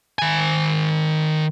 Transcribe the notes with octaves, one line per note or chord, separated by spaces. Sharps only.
D#3 G#5